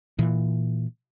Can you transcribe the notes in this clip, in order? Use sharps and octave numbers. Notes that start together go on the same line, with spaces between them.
A#2 E3